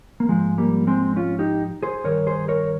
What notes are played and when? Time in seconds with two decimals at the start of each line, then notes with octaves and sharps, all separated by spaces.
0.20 A#3
0.29 G#2 F3 G#3
0.58 G3 A#3
0.87 G#3 C4
1.16 C#4 F4
1.39 D#4 G4
1.83 G#4 C5
2.04 G2 D#3 A#4 C#5
2.27 G#4 C5
2.48 A#4 C#5